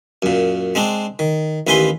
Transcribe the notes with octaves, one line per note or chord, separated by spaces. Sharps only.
F#2 A#2
G#3 C4 D4
D#3
A1 D#2 E4 B4 G#5 C6